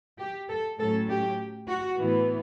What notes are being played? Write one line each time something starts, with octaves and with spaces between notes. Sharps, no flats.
G4
A4
A2 F#3 C#4 A4
G4
F#4
A2 E3 B3